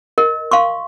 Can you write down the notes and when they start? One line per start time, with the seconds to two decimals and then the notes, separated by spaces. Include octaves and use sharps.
0.18 A#4 D#5
0.51 F5 C6 C#6